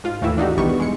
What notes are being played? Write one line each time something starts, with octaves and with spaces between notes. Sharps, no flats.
G#2 F4 F5
D#2 A2 E3 E4 E5
D4 D#4 F#4 G4
B1 E2 D#3 G3 B3 C#6
G#3 C#7